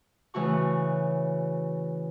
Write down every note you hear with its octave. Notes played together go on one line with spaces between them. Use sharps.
C#3 E3 A3 F#4 C#6